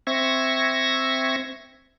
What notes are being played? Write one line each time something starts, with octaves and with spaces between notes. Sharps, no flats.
C4 E5 C#6 G#6 A#6